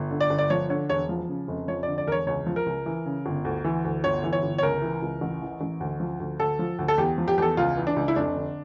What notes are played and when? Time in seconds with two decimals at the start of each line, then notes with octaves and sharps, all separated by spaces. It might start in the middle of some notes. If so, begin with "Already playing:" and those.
Already playing: G1
0.11 D3
0.21 D5
0.30 G1
0.38 D5
0.50 F3 C#5
0.69 D3 C#5
0.89 E1 C#5
1.09 F3
1.29 C#3
1.48 F1
1.68 F3 C#5
1.83 D3 D5
1.98 D5
2.07 E1 A#4
2.12 C#5
2.27 C#2 C#5
2.46 F3
2.56 A#4
2.66 C#2
2.86 E3
3.06 C#3
3.26 G1
3.45 D2
3.64 E3
3.85 D2
4.04 G1 C#5
4.24 E3
4.33 C#5
4.43 G1
4.58 C#5
4.63 C#2 A#4
4.82 E3
5.02 C#2
5.21 A1
5.41 E3
5.61 A1
5.80 D2
6.00 F3
6.20 D2
6.40 D2 A4
6.59 F3
6.79 D2
6.88 A4
6.98 E2 G4
7.18 F3
7.28 G4
7.38 E2 G4
7.42 A4
7.57 C#2 F4
7.77 E3
7.87 D4
7.96 C#2
8.08 E4
8.16 F1 D4
8.36 D3